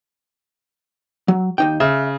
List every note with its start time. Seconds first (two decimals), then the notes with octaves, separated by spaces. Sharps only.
1.28 F#3
1.58 D#2 D#4 G5
1.80 C#3 E5